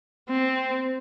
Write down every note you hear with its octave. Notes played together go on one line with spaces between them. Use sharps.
C4